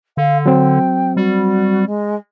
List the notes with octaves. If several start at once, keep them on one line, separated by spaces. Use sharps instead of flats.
D3 F5
F#3 C4 G5
G3 F#4
G#3